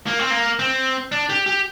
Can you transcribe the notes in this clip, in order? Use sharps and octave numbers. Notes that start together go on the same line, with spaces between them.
A#3
C4
A#3
C4
D4
G4
G4